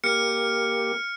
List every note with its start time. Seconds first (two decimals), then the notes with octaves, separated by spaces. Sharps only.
0.04 A#3 G4 F6 C#7